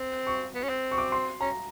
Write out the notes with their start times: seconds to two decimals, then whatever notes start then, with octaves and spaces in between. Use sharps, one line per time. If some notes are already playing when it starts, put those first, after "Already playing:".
Already playing: C4
0.27 C#6
0.55 B3
0.64 C#4
0.69 C4
0.91 C#6
0.98 D6
1.12 C6
1.41 C#4 A#5